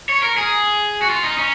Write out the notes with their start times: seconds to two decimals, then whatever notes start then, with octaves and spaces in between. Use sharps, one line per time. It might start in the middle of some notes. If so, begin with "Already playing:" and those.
0.09 C#5
0.22 A#4
0.37 G#4
1.02 F#4
1.10 F4
1.24 D#4
1.38 C#4